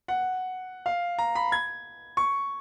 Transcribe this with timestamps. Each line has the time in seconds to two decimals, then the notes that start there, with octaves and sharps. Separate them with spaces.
0.08 F#5
0.86 F5
1.18 A#5
1.35 B5
1.52 G#6
2.17 C#6